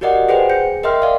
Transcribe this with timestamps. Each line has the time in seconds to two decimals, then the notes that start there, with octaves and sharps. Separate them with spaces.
0.01 F#4 G4 A#4 D5 D#5 F#5
0.28 G#4 B4 C5 F#5 G5
0.50 G#4 G6 C#7
0.83 A#4 D#5 E5 G5 C6 F6
1.02 D5 F5